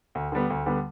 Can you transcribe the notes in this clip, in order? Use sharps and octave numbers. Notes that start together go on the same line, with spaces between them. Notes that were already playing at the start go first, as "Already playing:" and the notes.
D2
D3 G3 B3
D2
D3 G3 B3